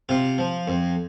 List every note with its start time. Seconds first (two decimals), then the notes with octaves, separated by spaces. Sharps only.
0.09 C3 F4
0.38 F3
0.68 F2